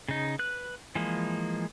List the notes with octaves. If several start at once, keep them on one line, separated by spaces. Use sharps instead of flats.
C#3 D#4
B4 F#6
E3 F3 G#3 A#3